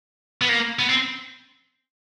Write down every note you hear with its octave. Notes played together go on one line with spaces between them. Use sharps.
B3
A#3
B3
C4